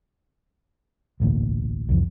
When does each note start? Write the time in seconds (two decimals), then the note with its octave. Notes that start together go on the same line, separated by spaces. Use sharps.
1.20 E1 A1 D2 A#2
1.89 C2 F2 E3